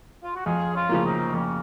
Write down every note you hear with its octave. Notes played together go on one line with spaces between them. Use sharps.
F4
F#4
F2 F4 G#4
C#4 F4
C#3 F3 A#3
C4 D#4
F2 A#3 C#4